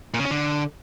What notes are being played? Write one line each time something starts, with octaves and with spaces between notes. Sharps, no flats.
A#2
C#3
C#4
D3